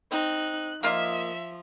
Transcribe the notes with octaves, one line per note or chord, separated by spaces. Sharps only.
C4 D#4 F#6
F3 A#3 F4 D#5 E5